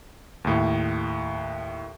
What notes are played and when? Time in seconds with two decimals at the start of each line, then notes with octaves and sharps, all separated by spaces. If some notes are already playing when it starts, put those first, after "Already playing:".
0.44 D#2 A2